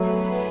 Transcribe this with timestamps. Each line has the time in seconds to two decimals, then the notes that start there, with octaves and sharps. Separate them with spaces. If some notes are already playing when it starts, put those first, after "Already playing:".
Already playing: F#3 A3 B3 E4 G#4 B4